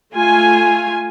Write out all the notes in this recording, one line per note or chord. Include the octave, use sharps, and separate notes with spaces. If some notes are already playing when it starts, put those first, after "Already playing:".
A3 F4 G#5